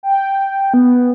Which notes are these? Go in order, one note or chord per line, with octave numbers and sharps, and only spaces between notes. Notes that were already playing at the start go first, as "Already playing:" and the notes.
G5
B3